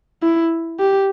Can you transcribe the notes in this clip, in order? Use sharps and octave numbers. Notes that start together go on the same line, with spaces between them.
E4
G4